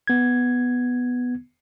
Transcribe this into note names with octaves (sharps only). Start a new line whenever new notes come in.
B3 G#6